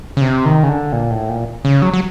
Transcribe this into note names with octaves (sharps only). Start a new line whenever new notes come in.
C#3
C3
D#3
C#3
D3
A#2
A2
A#2
C#3
F#3
F#3